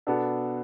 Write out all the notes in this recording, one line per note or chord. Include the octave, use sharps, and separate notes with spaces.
B2 B3 D4 A4